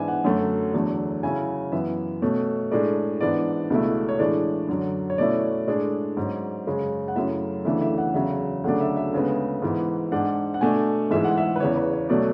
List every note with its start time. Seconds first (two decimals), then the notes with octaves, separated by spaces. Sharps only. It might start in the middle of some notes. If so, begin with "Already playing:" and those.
Already playing: G#2 E3 B3 D4 E5 G#5
0.08 F#5
0.24 F#2 D3 F#3 A3
0.74 E2 D3 F#3 A3 D4
1.23 C#3 F#3 C#4 E4 G#5
1.72 F#2 E3 B3 E5
2.22 B2 A3 C#4
2.71 A2 G#3 D4 D5
3.21 G#2 E3 B3 D4 D5
3.70 C#2 B2 A3 E4
4.09 C#5
4.19 A2 E3 G#3 D4 D5
4.68 F#2 D3 F#3
5.10 C#5
5.18 B2 A3 C#4 E4 D5
5.67 A2 G#3 D4 D5
6.17 G#2 F#3 C#4
6.67 F#2 C#3 G#3 C#4
7.08 F#5
7.16 F#2 C#3 F#3 A3 E4 E5
7.65 D2 C#3 E3 A3 D4 E5
7.81 E5
7.98 F#5
8.14 E2 C#3 F#3 E5
8.64 D2 C#3 F#3 A3 D4 F#5
8.80 E5
8.97 E5
9.13 D2 C#3 G#3 B3
9.62 G#2 E3 B3
10.12 G#2 G#3 D4 F#5
10.54 F#5
10.61 B2 A3 D4 G#5
11.11 G#2 E3 G#3 E5
11.24 F#5
11.38 E5
11.56 B4
11.60 E2 C#3 E3 C#5
11.77 B4
11.93 C#5
12.09 B2 F#3 A3 C#4 D5